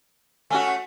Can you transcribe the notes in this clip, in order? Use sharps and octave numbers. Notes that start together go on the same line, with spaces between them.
A3 C#4 F#4 G#5 F6